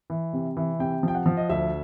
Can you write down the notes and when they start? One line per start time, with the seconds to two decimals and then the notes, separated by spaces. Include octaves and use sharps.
0.10 E3
0.33 C3
0.57 E3
0.79 C3 G5
1.03 F3 G5
1.15 F#5
1.26 F3
1.37 D#5
1.49 D2 E5